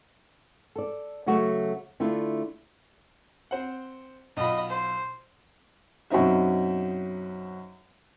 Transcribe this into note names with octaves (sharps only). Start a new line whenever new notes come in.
A4 D5
C#3 F#3 A3 F#4 C#5
D3 A3 D4 E4 F4
C4 C5 F#5
B1 F4 D#5 B5
C5
F#2 B2 C4 D#4 E5